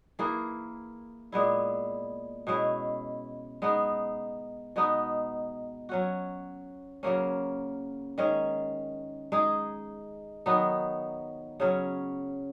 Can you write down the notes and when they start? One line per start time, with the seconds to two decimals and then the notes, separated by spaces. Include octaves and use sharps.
0.19 E3 A#3 E4 G#4
1.32 A#2 G#3 B3 E4
2.47 B2 G#3 C#4 E4
3.62 G#3 B3 D#4
4.76 B2 G#3 B3 D#4
5.89 F#3 C#4 F#4
7.03 C#3 F#3 A#3 C#4
8.18 D#3 G#3 C#4
9.32 G#3 D#4 G#4
10.46 D#3 F#3 B3 D#4
11.60 C#3 F#3 C#4